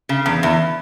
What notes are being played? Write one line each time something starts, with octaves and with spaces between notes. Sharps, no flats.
C#3
E2
E2